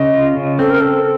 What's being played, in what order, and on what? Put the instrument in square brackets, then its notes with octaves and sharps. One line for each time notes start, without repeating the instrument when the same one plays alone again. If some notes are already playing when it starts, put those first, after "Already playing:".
Already playing: [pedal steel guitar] C#3 [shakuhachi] D#5
[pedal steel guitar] F4
C#3
[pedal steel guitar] C4 [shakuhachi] A4
[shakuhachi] A#4
[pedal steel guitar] C4 [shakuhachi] A4